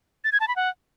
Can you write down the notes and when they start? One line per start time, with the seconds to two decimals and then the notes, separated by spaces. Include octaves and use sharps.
0.24 A6
0.32 G#6
0.40 A5
0.48 B5
0.56 F#5